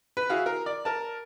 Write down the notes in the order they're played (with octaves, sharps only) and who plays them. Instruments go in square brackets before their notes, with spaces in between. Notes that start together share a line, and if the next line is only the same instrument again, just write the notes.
[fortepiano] B4
E4 F#4 G#4 F5 F#5
A#4
D5
A#4 A5